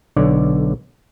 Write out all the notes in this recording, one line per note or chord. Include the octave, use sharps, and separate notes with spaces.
B1 D3 C#5 D5